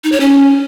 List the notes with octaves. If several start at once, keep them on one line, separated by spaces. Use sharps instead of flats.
D#4
C#5
C#4